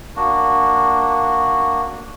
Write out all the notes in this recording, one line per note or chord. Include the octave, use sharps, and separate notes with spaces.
A#3 D4 F#4